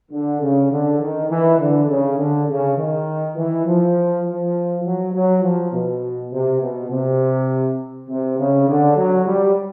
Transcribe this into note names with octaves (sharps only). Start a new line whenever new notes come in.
D3
C#3
D3
D#3
E3
D3
C#3
D3
C#3
D#3
E3
F3
F3
F#3
F#3
F3
B2
C3
B2
C3
C3
C#3
D3
F#3
G3